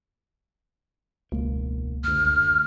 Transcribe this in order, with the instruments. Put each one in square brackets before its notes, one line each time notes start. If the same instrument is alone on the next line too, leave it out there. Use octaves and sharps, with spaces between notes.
[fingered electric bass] E1 A#3 [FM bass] C#2
[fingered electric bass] F#1 D2 [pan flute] F6